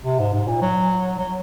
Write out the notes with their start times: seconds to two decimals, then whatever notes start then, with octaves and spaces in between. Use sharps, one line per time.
0.05 C3
0.19 G#2
0.34 G#2
0.48 A#2
0.62 F#3
1.19 F#3